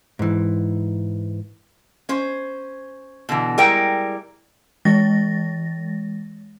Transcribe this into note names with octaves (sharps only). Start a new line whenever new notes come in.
G#2 E3
C#4 C5
B2 D3 E3
G3 G#3 E4 A#4 G5
E3 G#3 A6 A#6